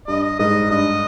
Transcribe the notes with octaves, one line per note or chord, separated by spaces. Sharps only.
G2 D#5
G#2 D#5
G2 D#5